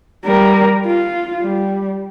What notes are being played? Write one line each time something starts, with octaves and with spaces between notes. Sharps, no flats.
G3 A#4
F4
G3